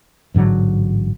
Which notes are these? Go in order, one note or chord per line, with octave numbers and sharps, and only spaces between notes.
A1 G#2 D3 F#3